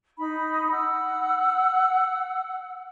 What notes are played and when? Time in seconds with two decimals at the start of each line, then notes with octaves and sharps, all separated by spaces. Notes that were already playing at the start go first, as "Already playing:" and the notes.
0.19 D#4 B5
0.71 F#5 E6